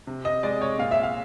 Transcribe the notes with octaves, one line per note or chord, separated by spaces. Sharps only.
C3
D#5
G#3 D5
C#5
A#2 F5
E5
F5